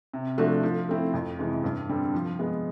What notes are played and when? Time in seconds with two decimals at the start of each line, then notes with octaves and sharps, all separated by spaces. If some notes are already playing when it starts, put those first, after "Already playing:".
0.14 C3
0.38 F3 A3 D4 F#4
0.63 F3
0.89 A3 C4 E4
1.14 F2
1.39 C3 E3 G#3
1.64 G2
1.89 D3 G3 C4
2.14 F3
2.39 G#3 B3